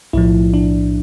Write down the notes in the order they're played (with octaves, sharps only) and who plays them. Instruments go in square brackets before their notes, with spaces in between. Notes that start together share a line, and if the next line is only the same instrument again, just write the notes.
[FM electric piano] B1 A2 F3 E4
D4